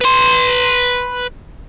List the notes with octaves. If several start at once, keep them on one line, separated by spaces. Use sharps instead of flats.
B4 C6